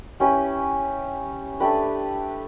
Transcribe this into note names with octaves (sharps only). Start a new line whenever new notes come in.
C#4 E4 G4 B4
A3 D4 G4 B4